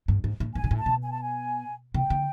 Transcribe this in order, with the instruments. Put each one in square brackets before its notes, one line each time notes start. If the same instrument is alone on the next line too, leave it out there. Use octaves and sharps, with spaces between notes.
[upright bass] G2
G#2
A2
[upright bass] G#2 [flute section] G#5
[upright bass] A#2
A2
[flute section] A5
[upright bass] B2
[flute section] G#5
A5
G#5
[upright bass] C3 [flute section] G5
[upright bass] D3